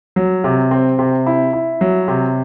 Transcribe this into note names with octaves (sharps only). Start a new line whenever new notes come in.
F#3
C3
C4
C3
E4
E4
F#3
C3